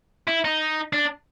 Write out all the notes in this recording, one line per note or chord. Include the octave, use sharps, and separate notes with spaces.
E4
D#4
D4